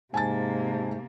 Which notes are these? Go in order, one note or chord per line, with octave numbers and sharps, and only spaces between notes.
G#2 C3 A#3 G#5 A5 A6